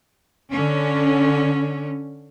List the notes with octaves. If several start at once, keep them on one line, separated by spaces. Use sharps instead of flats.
D3 C#4